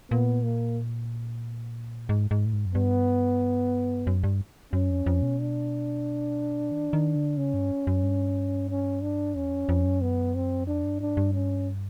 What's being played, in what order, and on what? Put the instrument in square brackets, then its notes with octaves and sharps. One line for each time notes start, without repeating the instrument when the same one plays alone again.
[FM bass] A#2 [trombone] B3
[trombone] A#3
[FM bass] G#2
G#2
A2
G#2
F#2
[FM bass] G2 [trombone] B3
[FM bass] F#2
G2
[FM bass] F#2 [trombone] C#4
[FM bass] F2
F2
B2
[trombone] D4
[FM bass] D#3
D#3
D3
[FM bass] C#3 [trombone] C#4
[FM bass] G2
F#2
G2
[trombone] C#4
D4
[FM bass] E2 [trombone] C#4
[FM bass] F2
F2
F#2
[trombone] B3
C4
[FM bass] F2 [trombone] D4
[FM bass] G2
[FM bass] G#2 [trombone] D4
[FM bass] G2
[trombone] C#4